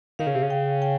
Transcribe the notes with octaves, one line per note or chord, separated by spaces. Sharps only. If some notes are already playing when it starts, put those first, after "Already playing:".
D#3 F5
C#3
C3
C#3
G5
G5